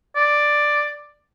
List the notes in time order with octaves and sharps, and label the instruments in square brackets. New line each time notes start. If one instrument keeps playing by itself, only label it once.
[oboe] D5